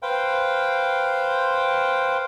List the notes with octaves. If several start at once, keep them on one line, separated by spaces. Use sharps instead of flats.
B4 C5 F5 G5